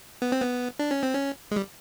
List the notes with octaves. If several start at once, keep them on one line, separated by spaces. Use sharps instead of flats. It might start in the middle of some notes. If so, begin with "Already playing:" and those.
B3
C4
B3
D4
C#4
C4
C#4
G#3
G3